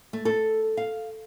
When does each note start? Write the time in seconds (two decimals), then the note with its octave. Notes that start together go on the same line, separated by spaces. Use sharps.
0.13 A3
0.25 A4
0.77 F5